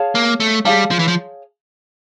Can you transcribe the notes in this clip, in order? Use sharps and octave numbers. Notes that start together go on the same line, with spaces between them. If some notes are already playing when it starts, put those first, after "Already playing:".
Already playing: G#4 C#5 F5 A5
A#3
A3
G3 G#4 C#5 F5 A5
F3
E3
F3